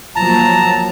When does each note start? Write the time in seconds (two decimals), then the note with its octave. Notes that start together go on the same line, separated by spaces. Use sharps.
0.16 F3 F#3 A#3 A5 A#5